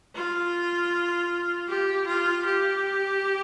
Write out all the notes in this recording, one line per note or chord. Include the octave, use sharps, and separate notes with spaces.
F4
G4
F4
G4